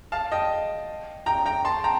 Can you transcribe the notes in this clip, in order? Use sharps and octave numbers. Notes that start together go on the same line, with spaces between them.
F5 A5
D#5 G5
G5 A#5
G5 A#5
A5 C6
G5 A#5